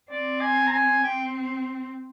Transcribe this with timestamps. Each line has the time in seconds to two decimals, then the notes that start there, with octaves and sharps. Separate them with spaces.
0.10 C4 D5
0.41 G#5
0.67 A#5
0.72 G#5
1.03 C4 G5